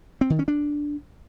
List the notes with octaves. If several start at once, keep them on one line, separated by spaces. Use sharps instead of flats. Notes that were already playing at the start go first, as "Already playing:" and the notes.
C4
D#3
C#4
D4